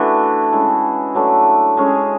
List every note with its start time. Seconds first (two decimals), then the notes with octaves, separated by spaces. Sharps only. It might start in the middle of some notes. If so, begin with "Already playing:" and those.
Already playing: E3 A3 D4 F#4
0.52 G#3 C#4 E4
1.15 F#3 A3 D4
1.77 G#3 C#4 G#4